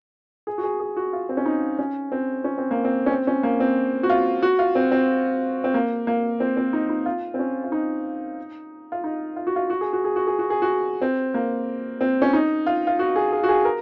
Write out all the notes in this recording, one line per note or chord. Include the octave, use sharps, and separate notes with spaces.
G#4
F#4
G#4
G#4
F#4
F4
C4
C#4
D#4
C#4
C4
C#4
C4
A#3
C4
C#4
C4
C#4
A#3
C4
F#4
F4
F#4
F4
C4
C4
C4
A#3
A#3
C4
C4
D#4
D#4
F4
C4
C#4
F4
D#4
F4
D#4
F4
F#4
F4
F#4
G#4
F#4
G#4
F#4
G#4
F#4
G#4
F#4
C4
A#3
C4
C#4
D#4
F4
F4
F#4
G#4
G#4
F#4
G#4
A#4